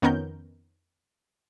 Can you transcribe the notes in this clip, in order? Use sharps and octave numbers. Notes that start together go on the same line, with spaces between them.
F2 D#3 B3 C#4 A#4 G6